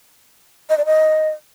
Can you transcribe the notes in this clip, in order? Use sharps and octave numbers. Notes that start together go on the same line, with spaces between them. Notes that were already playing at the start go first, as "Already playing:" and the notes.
D#5
D5
D#5